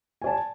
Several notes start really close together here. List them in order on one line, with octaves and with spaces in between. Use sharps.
G#5 D5 A5